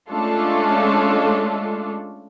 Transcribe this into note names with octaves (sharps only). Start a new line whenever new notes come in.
G#3 A3 C#4 D4 F4 A4